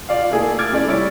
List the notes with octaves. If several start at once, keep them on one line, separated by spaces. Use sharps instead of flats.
F4 D5 F5
A3 A#3 E4 G#4
D6 F6 G#6 A6 D7
A3 C#4 E4 D5
G3 E4 C#5 A6 D7